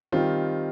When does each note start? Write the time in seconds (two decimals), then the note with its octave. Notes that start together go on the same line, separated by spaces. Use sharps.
0.12 D#3 G3 C4 F4